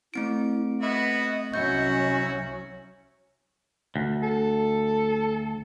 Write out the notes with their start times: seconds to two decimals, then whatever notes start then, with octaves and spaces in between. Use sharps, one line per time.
0.14 A3 C4 E4 D7
0.82 B3 E4 F#4 D#5
1.54 C2 F#3 C#4 E4 F#4 C#5 G6
3.96 D2
4.22 A4